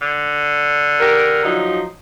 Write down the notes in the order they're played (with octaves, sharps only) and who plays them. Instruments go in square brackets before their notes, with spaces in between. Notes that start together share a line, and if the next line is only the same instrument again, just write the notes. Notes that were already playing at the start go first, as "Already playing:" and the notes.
[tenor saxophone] D3
[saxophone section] G4 A#4
F3 F#3 D#4